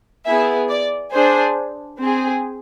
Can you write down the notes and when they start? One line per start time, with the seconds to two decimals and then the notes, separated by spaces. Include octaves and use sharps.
0.25 B3 E4 G#4 E5
0.69 D5
1.12 D4 G#4 C5
1.99 C4 G#4